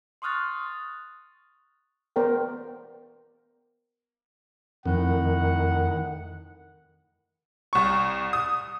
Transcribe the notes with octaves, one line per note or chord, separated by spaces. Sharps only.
C6 C#6 D#6 F6 F#6 A6
B3 A#4 C5 D5 G5
F2 A2 D#3 F#5
C2 C#6
D#6